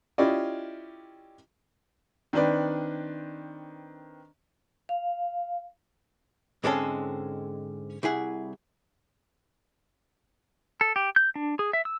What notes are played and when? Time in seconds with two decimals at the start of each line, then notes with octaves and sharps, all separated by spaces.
0.18 C#4 E4 F4 G4 D5 D#5
2.33 D#3 C4 D4 B4 D5
4.89 F5
6.64 G#2 D3 G#3 C4 C#4 A4
8.03 C2 E4 G#4 F#5
10.81 A4
10.96 G4
11.16 G6
11.36 D4
11.59 G#4
11.73 E5
11.85 E6